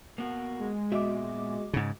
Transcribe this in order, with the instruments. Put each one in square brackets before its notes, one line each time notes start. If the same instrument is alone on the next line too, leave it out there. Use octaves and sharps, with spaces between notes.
[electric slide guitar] A#3 B3 F#4
[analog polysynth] G#3
[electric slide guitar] A#2 B3 E5 [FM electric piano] F#4 D#5 D6
[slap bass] G#2 C#3